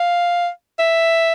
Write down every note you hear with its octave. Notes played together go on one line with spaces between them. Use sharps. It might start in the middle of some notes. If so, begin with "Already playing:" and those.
Already playing: F5
E5